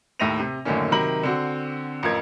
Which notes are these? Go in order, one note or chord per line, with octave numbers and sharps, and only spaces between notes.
D#2 A2 E5 A#6 D#7 F7
C3
F#2 A2 D3 D#3 A#3 C#4
C3 D#3 F#3 A#4 B5 F#7
D3 C4 F#4
A1 F2 F4 A#4 G#6